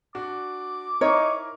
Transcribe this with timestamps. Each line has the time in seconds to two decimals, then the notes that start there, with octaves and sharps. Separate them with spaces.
0.15 D4 F#4 D6
1.01 D#4 E4 A#4 C#5